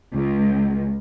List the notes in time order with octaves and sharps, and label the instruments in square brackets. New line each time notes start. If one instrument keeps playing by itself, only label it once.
[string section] C#2